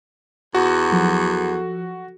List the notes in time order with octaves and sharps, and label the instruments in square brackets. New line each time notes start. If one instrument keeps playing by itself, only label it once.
[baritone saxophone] E2 [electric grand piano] F#4
[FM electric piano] F3 F#3 A4